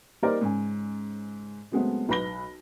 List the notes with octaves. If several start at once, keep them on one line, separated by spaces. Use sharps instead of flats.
G3 A#3 D#4 A#4 C5 D5
G#2 C#3 G#5
C#3 F#3 G#3 A3 B3 C4
B1 B4 B5 A#6 G7